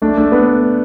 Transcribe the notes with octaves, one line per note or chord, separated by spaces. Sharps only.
A3 D4
A3 D4
B3